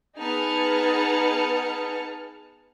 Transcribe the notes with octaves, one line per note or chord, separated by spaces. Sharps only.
B3 D#4 G#4 A5 F6 C#7